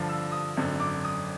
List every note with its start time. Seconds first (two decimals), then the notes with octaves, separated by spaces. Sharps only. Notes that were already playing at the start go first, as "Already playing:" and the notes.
Already playing: G2 D3 F3
0.09 E6
0.32 D#6
0.57 G#1 F#2 D3
0.80 D6
1.04 D#6